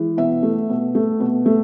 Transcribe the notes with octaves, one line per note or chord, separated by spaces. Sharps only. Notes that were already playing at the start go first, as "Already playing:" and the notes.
Already playing: E3 G#3
B2 E5
A3
B2
A3
B2
A3